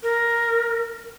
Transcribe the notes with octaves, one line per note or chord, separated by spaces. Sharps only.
A#4